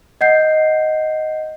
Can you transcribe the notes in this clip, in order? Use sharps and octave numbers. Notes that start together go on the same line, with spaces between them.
D#5 F#5 G6 C7